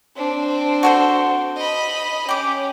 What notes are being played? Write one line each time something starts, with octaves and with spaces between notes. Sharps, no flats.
C4 D4
F#4 A4 C5
D#5 B5
C#4 G4 D6